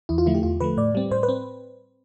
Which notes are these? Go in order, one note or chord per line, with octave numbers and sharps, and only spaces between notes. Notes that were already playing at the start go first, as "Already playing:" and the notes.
E2 E4
F4
D3 F3 A3 E4
G4
E2 F4
D3 F3 A3 B4
A2 D5
G3 C4
A2 C5
B4
C4